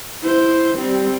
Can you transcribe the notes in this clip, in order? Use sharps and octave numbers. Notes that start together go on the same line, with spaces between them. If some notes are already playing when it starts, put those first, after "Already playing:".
E4 C5
G3 C4